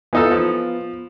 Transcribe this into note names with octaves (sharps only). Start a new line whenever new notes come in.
E3 B3 D#4 F4 A4
F3